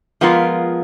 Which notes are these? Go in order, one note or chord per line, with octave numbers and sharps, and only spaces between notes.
F3 G#3 B3 F4 A#4